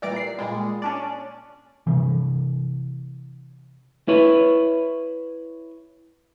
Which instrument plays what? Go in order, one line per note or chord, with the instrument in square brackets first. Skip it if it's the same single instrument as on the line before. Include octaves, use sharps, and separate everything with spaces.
[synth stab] A#2 E3 G3 D5 A#5 D7
C7
A#2 G3 G#3
C#4 D4 D5
[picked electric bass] C3 E3
[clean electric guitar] E4 B4 C#5